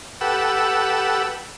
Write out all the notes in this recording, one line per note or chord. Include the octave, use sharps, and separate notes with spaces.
G4 A4 B4 F#5 E6